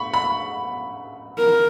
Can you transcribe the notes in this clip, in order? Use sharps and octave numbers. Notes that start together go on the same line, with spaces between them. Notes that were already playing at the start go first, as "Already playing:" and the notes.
Already playing: B5 C#6
B5
A#4